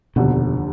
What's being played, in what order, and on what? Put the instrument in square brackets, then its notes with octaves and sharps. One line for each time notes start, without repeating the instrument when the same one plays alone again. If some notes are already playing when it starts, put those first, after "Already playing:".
[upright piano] F1 D#2 D3 [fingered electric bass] B2